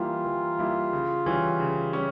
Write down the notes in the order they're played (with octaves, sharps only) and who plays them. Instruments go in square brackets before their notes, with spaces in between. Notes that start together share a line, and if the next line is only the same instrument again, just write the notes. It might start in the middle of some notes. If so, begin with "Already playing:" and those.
Already playing: [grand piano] E3 G3 A#3 E4 [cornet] F4
[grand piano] E3
G3 A#3 E4
C#3
E3 G3 C#4
C#3
G3 C#4